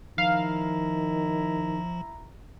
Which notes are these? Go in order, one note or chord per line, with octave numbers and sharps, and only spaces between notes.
D#3 F3 E4 F5 A#5